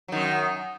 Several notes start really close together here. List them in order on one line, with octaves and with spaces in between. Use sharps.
F#3 D#3 F#2